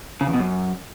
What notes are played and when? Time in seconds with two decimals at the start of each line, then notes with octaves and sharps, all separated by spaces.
0.21 C#3
0.27 E2
0.33 B2
0.39 F#2